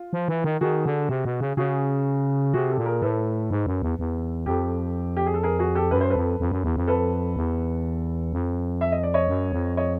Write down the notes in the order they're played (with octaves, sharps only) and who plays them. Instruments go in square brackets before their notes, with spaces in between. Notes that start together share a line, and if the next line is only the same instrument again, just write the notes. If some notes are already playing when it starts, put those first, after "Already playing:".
Already playing: [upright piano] F4
[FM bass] F3
E3
D#3
[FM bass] D#3 [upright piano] F#4 G#4
[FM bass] D3
C3
B2
C#3
[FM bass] C#3 [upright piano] F#4 G#4
[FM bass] C3 [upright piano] F#4 G#4
[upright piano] G4 A4
[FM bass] A#2
[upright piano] G#4 A#4
[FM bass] A2 [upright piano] A4 B4
[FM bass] G#2
F#2
E2
E2
[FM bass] F2 [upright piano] G4 A4
[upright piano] G4
G#4
A4
G#4 A#4
F#4 G#4
G4 A4
[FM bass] F#2 [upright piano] B4
[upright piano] C5
A4 B4
[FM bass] F2
F2
F#2
E2
F2
[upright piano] A4 B4
[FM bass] E2
F2
[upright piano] E5
D#5
D5
C#5 D#5
[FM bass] F#2
F2
[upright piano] C#5 D#5